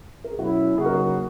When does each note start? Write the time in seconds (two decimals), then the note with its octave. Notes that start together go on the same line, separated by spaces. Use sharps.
0.24 A#4
0.32 G#4
0.39 B2 F#3 C#4 E4 F#4
0.78 C#3 F#3 A#3 D#4 F#4 G#4
0.86 A#4
0.93 G#4